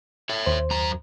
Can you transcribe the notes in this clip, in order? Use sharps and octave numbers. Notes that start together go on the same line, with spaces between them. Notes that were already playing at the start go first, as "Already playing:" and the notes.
C#5 E5
D#2 C5
F#2 A#5